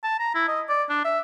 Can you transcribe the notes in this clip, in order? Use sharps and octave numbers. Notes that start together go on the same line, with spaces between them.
A5
A#5
E4
D#5
D5
D4
E5